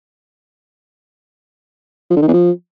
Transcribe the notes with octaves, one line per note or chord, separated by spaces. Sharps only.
F3
D3
D#3
E2
F3